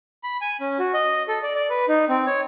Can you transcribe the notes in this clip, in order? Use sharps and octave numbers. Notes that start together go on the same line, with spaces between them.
B5
G#5
C#4
F#4
D#5
A4
D5
D5
B4
D#4
C4
C#5